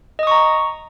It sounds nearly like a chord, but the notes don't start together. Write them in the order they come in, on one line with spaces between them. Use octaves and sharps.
D#5 D#6 C#6 A#5